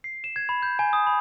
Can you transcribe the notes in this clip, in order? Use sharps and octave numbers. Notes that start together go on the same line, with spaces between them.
C7
E7
G#6
B5
G6
G#5
D#6
B5